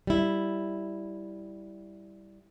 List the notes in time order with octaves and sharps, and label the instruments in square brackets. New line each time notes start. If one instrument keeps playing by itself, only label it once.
[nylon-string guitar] G3 E4